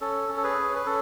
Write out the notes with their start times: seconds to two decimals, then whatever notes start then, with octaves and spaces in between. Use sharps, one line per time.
0.01 C#4 A4
0.29 C#4
0.37 A4
0.43 G#4 B4
0.58 C#4
0.76 B4
0.86 C#4 A4